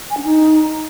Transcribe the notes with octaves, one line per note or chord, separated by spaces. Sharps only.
G#5
D4
D#4